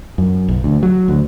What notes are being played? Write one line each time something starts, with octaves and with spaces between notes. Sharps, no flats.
F#2
B1
D2
F#3
D2